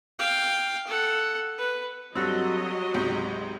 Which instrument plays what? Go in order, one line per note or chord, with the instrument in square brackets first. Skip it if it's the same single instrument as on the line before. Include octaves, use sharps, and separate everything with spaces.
[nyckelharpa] F5 G5
A4 F#5
B4
[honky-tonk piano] G2 G3 E6 [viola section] F#3 D#5 [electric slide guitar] C4 F#4 A4
[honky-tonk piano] C#2 G#2 C3 [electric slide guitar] G4